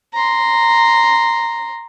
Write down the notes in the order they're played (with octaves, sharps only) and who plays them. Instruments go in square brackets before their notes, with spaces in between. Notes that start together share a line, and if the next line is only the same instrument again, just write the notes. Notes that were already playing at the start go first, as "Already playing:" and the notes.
[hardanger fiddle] A#5 C6